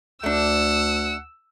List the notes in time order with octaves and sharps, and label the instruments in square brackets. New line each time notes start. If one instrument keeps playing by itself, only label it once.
[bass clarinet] D2 [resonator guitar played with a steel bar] A3 D4 [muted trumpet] F#5 [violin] E6